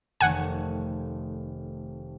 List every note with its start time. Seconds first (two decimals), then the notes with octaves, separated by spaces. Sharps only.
0.21 F1 D#3 A3 F#5 G#5